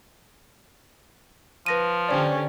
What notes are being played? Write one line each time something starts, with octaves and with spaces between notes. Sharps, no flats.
F3 B4 A#6 D#7
D3 C#4 G4 C5 D5